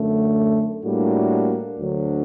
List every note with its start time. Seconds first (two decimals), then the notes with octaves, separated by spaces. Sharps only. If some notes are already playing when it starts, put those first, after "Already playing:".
Already playing: F#2 D3 A3
0.84 A2 G3 A#3 D4 F#4
1.79 D2 D3 F#3